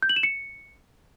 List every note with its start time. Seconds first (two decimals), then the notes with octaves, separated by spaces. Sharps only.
0.02 G6
0.09 F#7
0.16 E7
0.23 C#7